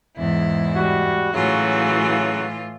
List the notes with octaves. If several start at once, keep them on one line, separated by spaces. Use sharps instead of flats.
E2 G#2 E4
G3 F#4
A2 C#3 E3 F#3 F4 F#4